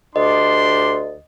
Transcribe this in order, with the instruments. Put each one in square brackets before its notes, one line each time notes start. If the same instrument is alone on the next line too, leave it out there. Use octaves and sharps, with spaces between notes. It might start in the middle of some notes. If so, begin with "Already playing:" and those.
[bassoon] D2 [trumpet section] D4 G4 C6 [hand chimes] D#5